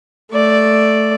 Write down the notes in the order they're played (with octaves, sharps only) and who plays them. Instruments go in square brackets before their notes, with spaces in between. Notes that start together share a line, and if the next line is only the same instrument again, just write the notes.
[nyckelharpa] A3 D5